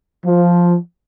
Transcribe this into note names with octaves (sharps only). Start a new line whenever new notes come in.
F3